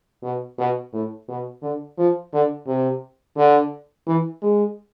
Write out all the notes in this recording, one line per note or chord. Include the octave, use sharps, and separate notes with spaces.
B2
B2
A2
B2
D3
F3
D3
C3
D3
E3
G#3